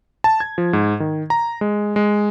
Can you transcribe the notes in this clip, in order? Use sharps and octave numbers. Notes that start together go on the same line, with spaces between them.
A5
G#6
F3
G#2
D#3
A#5
G#3
G#3